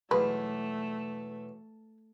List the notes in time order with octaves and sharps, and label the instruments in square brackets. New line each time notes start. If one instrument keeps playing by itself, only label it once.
[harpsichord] B1 E2 [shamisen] G#3 B4 [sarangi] A3